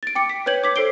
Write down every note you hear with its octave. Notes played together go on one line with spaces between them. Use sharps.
A6 D7
G5 D6 C#7
B6
B4 C#5 G6 G#6 F#7
D6 B6
A4 C5 C7 D7 G7